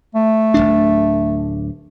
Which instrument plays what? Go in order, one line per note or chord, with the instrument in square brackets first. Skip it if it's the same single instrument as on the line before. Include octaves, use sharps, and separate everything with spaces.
[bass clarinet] A3
[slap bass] D1 G1 D4